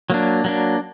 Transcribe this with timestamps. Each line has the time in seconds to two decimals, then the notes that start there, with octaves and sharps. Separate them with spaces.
0.10 F#3 A#3 D4
0.44 F#3 A#3 D4